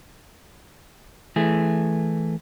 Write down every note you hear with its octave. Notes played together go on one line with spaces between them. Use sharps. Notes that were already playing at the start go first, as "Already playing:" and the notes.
E3 A3 G#4